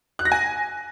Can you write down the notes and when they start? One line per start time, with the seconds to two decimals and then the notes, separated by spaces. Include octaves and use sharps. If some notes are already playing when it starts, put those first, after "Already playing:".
0.19 F#6
0.25 A#6
0.32 G#5